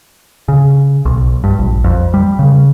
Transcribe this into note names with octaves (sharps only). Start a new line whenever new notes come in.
C#3
B1
G2
A#1
F2
G3
C#3